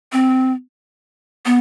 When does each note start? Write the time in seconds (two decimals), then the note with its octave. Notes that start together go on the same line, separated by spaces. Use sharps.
0.13 C4
1.46 B3